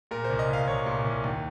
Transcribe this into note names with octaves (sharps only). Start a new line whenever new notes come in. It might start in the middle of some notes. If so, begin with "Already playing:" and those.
A#2 A#4
C5
C2
D#5
C2 F5
C2 C#5
A#2
C2
D#2